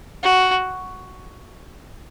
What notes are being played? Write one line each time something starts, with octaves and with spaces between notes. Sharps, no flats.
F#4